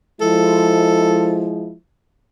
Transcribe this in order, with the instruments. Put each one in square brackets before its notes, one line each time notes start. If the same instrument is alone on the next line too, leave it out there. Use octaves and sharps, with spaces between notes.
[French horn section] F3 G#3 E4 [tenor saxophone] A4